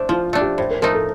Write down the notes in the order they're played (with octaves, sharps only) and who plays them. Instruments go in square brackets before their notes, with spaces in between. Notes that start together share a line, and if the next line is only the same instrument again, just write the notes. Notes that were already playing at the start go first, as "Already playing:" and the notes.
Already playing: [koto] A3 D4 [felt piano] C5
[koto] F3 [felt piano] F4
[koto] A3 D4
[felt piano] G4
[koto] A2 [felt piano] C5
[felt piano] A#4
[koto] F3 A3 D#4 [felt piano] A#4
[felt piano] A4